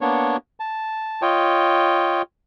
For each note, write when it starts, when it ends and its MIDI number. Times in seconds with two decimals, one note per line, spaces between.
0.01 0.37 58
0.01 0.37 59
0.01 0.37 62
0.01 0.37 73
0.60 1.22 81
1.22 2.22 65
1.22 2.22 73
1.22 2.22 75
1.22 2.22 79